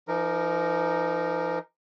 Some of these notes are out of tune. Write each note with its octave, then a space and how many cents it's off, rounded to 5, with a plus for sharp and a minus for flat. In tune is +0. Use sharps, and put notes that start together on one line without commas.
F3 -45 D#4 -5 A#4 -5